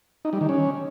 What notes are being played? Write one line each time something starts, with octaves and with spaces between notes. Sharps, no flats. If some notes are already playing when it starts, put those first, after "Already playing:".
D#4
G3
D#3
C#4